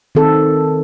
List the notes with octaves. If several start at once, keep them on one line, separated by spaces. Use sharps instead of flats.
D#3 C4 A4